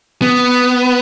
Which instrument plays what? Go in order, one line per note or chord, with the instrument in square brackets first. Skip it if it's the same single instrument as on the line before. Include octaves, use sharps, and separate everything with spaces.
[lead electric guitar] B3